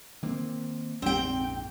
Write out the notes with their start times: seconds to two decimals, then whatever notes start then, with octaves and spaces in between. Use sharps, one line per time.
0.23 D#3 A#3 C4
1.02 A#1 F2 G#2 C4 G5